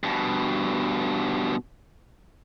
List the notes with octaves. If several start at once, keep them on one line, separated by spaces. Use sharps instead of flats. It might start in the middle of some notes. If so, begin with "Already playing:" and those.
G2 B2